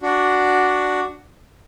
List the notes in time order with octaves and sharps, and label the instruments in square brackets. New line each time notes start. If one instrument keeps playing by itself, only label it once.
[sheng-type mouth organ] D4 F#4